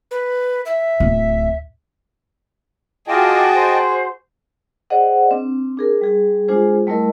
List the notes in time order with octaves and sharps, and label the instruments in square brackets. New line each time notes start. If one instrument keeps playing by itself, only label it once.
[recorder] B4
E5
[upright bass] D1
[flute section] F4 D6 [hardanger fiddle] F#4 G#4 [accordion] D#5 G5 A5
[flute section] C5
[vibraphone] G#4 C5 D5 D#5 F#5
C4 D4
D4 G#4 A#4
G3 G#4
G#3 D4 F4 G#4 C5
G3 A3 E4 A#4 D#5